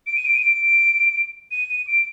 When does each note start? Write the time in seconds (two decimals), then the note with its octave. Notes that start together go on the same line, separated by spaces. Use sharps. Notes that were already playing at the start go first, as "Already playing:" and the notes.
0.07 D7
0.16 D#7
0.25 D7
0.34 D#7
0.43 D7
1.51 D#7
1.69 D#7
1.87 D7